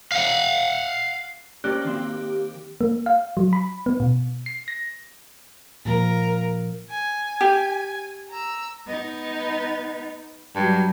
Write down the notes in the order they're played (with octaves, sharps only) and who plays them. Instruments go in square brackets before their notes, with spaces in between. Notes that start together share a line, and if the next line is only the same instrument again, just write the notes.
[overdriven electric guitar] F5 F#5
[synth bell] A#3 G4 [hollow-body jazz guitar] C#4 C5 D5 [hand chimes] F#6
[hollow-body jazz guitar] D#3 C4
[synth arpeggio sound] A#3
F5
F#3
B5
B3
B2
C7
A#6
[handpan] A#2 F3 A#3 [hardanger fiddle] A#4
[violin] G#5
[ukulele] G4
[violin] A#5 E6
[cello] B3 D#4
[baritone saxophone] G2 [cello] F#3